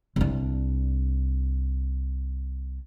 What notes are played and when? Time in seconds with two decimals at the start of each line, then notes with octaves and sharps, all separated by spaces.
0.16 C2 D4